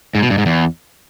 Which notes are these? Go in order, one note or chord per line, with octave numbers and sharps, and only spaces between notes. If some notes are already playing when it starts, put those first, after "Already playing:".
G#2
B2
G2
G#2
E2